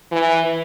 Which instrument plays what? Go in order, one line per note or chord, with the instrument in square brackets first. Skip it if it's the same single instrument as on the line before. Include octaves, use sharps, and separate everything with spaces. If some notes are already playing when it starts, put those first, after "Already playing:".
[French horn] E3